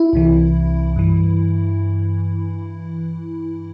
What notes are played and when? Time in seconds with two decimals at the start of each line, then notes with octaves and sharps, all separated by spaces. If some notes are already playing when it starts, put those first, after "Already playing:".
Already playing: E4
0.13 C2 C3 E3
0.96 G2 E3